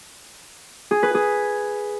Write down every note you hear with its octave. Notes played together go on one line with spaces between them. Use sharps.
G#4
B4
G#4